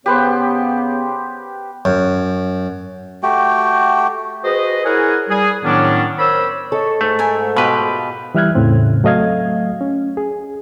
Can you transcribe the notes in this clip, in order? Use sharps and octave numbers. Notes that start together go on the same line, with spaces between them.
C#3 B3 G4 B4 C5
F#2
A3 F#4 G4 G5
F#4 G#4 B4 C5 D#5
E4 G#4 A#4 C#5 F#5 G#5
G3 G#4
A2 D#3 F#3 B3 C#4 D4
A#4 C5 C#5 B5 E6
A4 C#5 D#5 C#6
G#2 A3
A#4 E5 G#5
B2 F4 G4 B4 E5
E3 G3 E5 F6 F#6 G#6
E2 A2 C#3 C4
F#3 A3 D#5 F5 G#6
C#4
G#4